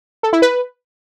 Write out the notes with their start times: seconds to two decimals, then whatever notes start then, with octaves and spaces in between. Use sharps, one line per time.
0.23 A4
0.33 E4
0.42 B4